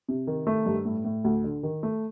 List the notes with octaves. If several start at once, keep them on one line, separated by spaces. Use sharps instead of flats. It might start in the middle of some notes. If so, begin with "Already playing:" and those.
C3
D#3
A3
G2
A2
A2
D2
D3
D#3
A3